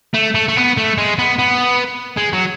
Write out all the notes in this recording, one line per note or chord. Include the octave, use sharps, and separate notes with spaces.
A3
A3
A3
B3
A3
G#3
B3
B3
G#3
F#3